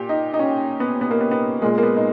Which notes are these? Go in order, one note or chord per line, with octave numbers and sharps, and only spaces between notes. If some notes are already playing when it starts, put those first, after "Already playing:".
Already playing: A#2 G4
D#4
D#4
C#4
B3
B3
A#3
B3
B3
A#2 G#3 A#3
A#3
B3
D#4